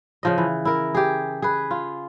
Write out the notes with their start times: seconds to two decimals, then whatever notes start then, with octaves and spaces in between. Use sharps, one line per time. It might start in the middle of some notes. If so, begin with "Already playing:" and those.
0.23 C#3 F3 D#5
0.38 E3
0.65 E4 A#4
0.95 G4 G#4
1.42 G#4 B4
1.71 F4